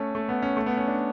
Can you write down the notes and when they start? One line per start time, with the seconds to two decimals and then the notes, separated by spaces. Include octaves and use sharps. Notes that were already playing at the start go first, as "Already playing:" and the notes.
Already playing: A3 C#4
0.15 A3
0.29 B3
0.42 C#4
0.57 A3
0.66 B3
0.77 C#4
0.88 D4